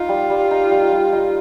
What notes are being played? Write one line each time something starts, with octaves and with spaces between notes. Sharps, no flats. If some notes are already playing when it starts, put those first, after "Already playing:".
Already playing: D#4 F4
G3
G3
D#4
G3
G3
D#4